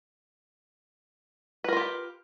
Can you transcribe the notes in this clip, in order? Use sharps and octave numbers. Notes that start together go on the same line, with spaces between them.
F4 G4 A#4 B4